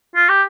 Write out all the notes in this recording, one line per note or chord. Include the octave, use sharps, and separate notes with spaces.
F4
G4